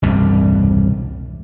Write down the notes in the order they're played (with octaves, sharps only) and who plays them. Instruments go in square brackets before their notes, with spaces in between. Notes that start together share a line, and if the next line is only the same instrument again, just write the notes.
[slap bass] E1 C2 G2